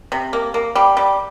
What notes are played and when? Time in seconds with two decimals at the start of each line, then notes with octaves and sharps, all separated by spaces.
0.12 C3
0.33 A#3
0.54 A#3
0.75 G3
0.97 G3